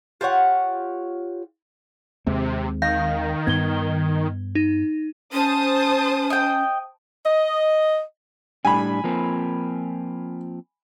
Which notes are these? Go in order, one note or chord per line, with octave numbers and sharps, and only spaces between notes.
F4 G4 C#5 F#5
D#2 C3 G#3 C4
D#3 F5 G6 A#6
G2 B3 G#6 G7
D#4
C#4 C5 A5 D#6
D#5 G5
D#5
A2 G3 D4 G#5 B5
F3 A#3 C4